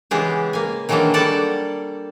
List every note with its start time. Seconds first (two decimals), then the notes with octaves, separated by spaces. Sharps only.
0.11 C#3 E3 G#3 B3 G4
0.53 A#3 G#5
0.89 D#3 E3 F#3 G#3 A#3 D4
1.14 G3 A#3 A4 D5 F#5